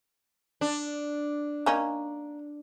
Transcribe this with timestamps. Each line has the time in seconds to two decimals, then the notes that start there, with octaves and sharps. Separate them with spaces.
0.61 D4
1.66 A#3 C#4 D#4